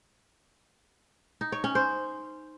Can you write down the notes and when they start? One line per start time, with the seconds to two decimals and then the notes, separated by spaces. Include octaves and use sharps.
1.41 D#4
1.52 C#5
1.64 C#4
1.75 C5